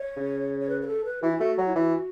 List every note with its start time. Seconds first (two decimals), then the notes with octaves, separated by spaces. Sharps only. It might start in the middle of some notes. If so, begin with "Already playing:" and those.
Already playing: C#5
0.17 C#3
0.60 C#5
0.69 B4
0.82 B4
0.87 A4
1.05 B4
1.23 E3 F#4
1.29 E4
1.37 A3 F#4
1.58 F#3
1.67 E4
1.75 E3 F#4